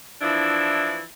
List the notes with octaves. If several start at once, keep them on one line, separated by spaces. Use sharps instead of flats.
E3 F3 D4 E4